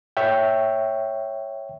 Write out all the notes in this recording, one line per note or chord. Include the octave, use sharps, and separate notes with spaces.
C#5 E5 G5